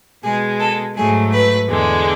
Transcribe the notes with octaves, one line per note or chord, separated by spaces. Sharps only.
B2 G#3 G#4
A4
G#2 F#3 A3 G#4
B4
E2 D3 G#3